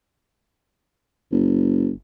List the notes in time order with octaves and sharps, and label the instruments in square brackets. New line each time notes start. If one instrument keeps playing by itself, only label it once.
[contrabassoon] F#1